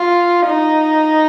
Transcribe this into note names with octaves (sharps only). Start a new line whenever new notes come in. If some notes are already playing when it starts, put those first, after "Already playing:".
Already playing: F4
D#4